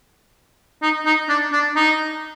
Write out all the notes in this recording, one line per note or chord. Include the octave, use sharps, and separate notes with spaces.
D#4
D#4
D4
D4
D#4